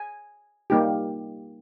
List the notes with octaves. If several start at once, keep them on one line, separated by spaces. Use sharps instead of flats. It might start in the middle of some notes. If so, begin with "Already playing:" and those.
Already playing: G#5
G3 A#3 D#4 G4